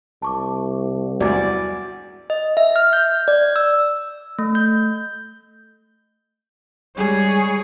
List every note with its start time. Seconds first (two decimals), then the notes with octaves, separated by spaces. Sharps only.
0.22 C2 A5 C#6 D6
1.20 E2 G2 E3 F#4 D5
2.30 D#5
2.57 E5
2.76 F6
2.93 G6
3.28 D5
3.56 E6
4.39 A3
4.55 G6
6.98 G3 G#3 G#4 C#5